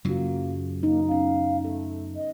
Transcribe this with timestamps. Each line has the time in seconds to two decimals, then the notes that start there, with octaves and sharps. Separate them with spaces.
0.05 F#2 C#3 F#3 A#3 F4 F#4
0.83 A#3 D#4
1.08 B3 C#4 F5
1.65 A3 A4
2.16 D#5